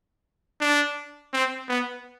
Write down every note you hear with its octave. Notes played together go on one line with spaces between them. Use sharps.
D4
C4
B3